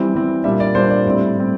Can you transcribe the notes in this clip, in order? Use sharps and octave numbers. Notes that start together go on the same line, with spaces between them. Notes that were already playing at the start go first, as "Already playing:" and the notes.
Already playing: E3 G3 C4
E3 G3 C4
A#2 G3 D4 E5
D5
A#2 G3 D4 C5
D5
A2 G3 C4
A2 G3 C4